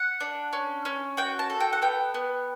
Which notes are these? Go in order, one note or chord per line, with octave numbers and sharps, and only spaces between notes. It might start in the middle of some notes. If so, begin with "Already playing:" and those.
Already playing: F#5
D4
C#4
C#4
F#4 G5
A5
A4
G5
F#5
B3 G5
B3